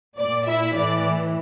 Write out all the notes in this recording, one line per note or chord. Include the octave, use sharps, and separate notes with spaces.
A#2 D5
E4 E5
A2 E3 D5